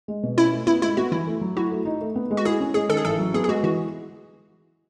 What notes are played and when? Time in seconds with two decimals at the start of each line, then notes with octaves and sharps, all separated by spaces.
0.08 G#3
0.23 B2
0.37 C#4 E4
0.52 A3
0.67 B3 E4
0.82 G#3 E4
0.97 B3 F#4
1.12 E3 E4
1.27 A3
1.41 F#3
1.56 E4 F#4
1.72 A3
1.85 D#4
2.01 A3
2.16 B3
2.31 G#3
2.37 F#4
2.45 E4 G#4
2.60 C#4
2.74 G#3 G#4
2.89 D#3 A4
2.97 G#4
3.05 A1 A4
3.19 F#3
3.34 B3 G#4
3.44 G#4
3.48 G#3 F#4
3.63 E3 F#4